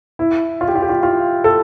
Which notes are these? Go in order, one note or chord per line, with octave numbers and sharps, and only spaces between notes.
E4
F4
G4
F4
G4
F4
F4
A4